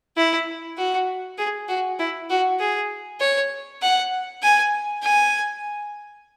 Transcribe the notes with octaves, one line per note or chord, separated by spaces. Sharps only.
E4
F#4
G#4
F#4
E4
F#4
G#4
C#5
F#5
G#5
G#5